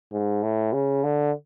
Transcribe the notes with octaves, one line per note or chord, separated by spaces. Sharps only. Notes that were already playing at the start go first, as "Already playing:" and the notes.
G#2
A2
C#3
D3